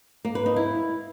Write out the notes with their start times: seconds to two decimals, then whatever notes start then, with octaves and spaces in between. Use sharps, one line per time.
0.25 A#3
0.35 B4
0.46 D#4
0.56 E4